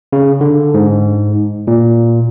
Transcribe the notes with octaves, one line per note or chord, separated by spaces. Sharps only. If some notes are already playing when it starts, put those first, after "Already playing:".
C#3
D3
G#2
A#2